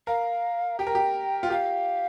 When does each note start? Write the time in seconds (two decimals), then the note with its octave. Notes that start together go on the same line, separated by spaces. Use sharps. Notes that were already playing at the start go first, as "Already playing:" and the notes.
0.07 A#4 F5
0.79 G4 G5
0.87 A#4
0.95 G4
1.43 F4
1.50 G4 F5